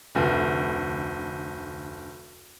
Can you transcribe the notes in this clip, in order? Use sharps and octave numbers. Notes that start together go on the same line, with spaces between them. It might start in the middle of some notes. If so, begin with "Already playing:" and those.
F1 D2